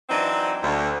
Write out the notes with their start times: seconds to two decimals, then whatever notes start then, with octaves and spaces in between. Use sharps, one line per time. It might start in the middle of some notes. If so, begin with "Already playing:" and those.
0.09 E3 F#3 C4 D4 D#4
0.63 D2